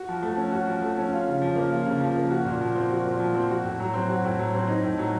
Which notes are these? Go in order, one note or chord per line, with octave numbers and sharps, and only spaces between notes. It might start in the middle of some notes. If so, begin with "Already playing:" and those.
Already playing: F#4
F3
A3
C#4
F#4
F3
A3
C#4
F4
C#3
F3
A#3
F4
C#3
F3
A#3
F#4
A#2
F3
C4
F#4
A#2
F3
C4
F#4
A2
F#3
C4
F#4
A2
F#3
C4
D#4
A2
F#3